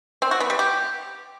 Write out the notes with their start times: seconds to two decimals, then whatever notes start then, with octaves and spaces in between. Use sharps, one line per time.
0.22 C4
0.31 F#4
0.40 B3
0.50 G3
0.59 G4